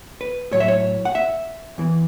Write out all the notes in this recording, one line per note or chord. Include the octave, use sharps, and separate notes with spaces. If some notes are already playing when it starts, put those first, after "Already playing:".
B4
A2 F#3 C#5
E5
C#5
F#5
E5
E2 E3